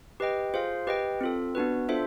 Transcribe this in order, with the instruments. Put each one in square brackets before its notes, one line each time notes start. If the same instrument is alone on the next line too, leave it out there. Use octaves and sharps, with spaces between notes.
[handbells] G4 B4 D#5 G5
F4 G#4 C5 F5
G4 B4 D#5 G5
C4 F4 A4
B3 D4 F#4 B4
D4 F4 A4 C5 E5